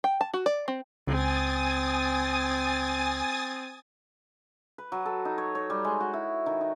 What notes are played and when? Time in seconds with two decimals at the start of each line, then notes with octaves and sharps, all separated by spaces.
0.04 G5
0.21 A5
0.34 F#4
0.46 D5
0.68 C4
1.07 C#2 C4 G#5 D#6 A6
4.78 B4
4.92 F#3
5.06 A4
5.25 D#4
5.38 C#5
5.55 C#5
5.70 G3
5.84 G#3
6.00 F#4
6.13 E4
6.46 D#3
6.61 D#4